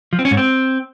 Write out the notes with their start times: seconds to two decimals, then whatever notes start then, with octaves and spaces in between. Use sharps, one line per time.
0.13 F3
0.19 C4
0.25 C#4
0.31 G#2
0.37 C4